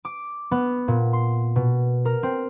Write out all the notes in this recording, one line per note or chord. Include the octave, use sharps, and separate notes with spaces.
D6
B3
A#2
C6
B2
A#4
C4